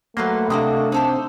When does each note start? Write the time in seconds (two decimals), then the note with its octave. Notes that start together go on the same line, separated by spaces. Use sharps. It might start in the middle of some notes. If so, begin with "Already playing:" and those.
0.17 F#3 A3 A#3 B4 C5 F#5 C6
0.50 C3 A#3 D4 F#4 D#5
0.92 C4 D#4 A4 C5